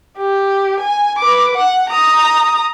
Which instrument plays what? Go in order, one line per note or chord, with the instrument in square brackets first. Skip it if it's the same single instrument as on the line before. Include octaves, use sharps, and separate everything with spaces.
[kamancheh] G4
G#5
B4 D6
F#5
A#5 D#6